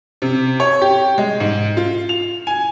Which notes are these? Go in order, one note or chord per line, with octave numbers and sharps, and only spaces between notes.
C3
C#5
G4
G#3
G#2
F4
F7
G#5